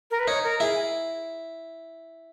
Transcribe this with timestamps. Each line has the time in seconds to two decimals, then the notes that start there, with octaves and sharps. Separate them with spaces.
0.11 A#4
0.19 B4
0.28 D#4 C#5
0.44 A#4
0.60 E4 G#4